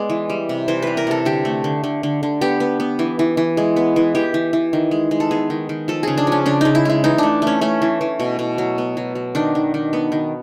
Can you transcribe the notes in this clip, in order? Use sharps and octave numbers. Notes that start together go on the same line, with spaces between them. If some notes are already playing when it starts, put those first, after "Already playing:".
Already playing: G#3 B3 D5
E3
G3
C3
E3 C5
G3 B4
A#4
C3 A4
D3 G4
A3
D3
D3
D3
D3
B3 G4
B3
B3
E3
E3
E3
G#3
B3
E3
E3 G4
E3
E3
D#3
G#3
G#3
A4
B3 G#4
D#3
D#3
F3 A4
C#3 G#4
D4
F3 C#4
C#3 D4
C#3 D#4
E4
G#3 E4
E3 D#4
A3 D4
A3 C#4
A3 C#4
E3
E3
B2
B2
F#3
B3
F#3
F#3
D#3 D4
D#3
D#3
B3
D#3